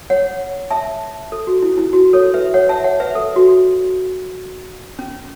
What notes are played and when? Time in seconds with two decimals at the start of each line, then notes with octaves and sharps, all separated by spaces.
0.10 C#5 F#5
0.71 E5 A5
1.32 A4
1.47 F#4
1.63 E4
1.78 E4
1.93 F#4
2.13 A4 C#5
2.34 B4 E5
2.54 C#5 F#5
2.69 E5 A5
2.84 C#5 F#5
3.00 B4 E5
3.15 A4
3.36 F#4
4.99 C#4